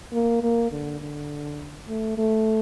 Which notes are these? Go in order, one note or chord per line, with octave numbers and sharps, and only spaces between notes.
A#3
A#3
D3
D3
A3
A3